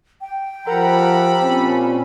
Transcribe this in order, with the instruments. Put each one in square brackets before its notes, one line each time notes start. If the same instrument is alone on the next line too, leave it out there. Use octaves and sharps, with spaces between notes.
[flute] G5
[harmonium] F3 F#5 A#5 [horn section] G4 A4 B5 [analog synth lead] A#4
[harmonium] A#2 C#4 [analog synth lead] C4